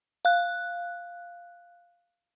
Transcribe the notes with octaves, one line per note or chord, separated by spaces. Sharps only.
F5 F#6